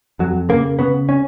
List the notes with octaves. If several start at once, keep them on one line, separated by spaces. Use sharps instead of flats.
F2 F#3
C#3 A#3
C#3 B3
C#4